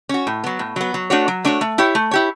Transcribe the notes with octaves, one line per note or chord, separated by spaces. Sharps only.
C#4 F#4
A2
F#3 B3
A2
F#3 B3
F#3
A3 D4 F#4 C#5
F#3
A3 D4 F#4 C#5
A3
E4 G4 C#5
A3
E4 G4 C#5